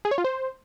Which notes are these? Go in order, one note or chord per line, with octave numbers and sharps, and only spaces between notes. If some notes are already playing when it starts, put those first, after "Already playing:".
G#4
C#5
F4
C5